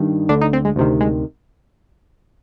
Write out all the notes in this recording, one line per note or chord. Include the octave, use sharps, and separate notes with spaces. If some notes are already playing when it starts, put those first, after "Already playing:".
Already playing: G2 D#3
D2 D3 D4
D#4
C4
G#3
D2 C3 D#3
G#3